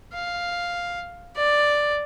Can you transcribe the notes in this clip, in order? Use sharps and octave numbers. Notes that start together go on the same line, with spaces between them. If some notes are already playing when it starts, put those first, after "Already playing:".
F5
D5